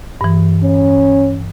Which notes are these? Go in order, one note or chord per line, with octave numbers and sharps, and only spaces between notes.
G2 E3
C#4